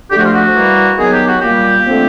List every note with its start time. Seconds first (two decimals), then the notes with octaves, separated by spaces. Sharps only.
0.11 D3 G4
0.13 F3 A3 F#4
0.25 F4
0.33 F#4
0.54 E3 G3 A#3
0.98 D#3 F#3 B3 G#4
1.13 G4
1.27 F#4
1.41 A#2 G3 A#3 G4
1.85 D3 F3 A3 C4